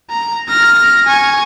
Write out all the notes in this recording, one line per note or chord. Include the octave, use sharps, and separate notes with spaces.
A#5
F6 A#6
G#5 C#6